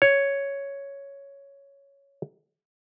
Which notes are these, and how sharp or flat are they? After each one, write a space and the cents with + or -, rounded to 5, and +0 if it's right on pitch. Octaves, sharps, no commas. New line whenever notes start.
C#5 +5